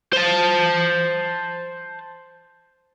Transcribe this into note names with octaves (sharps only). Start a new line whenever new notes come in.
C5 A5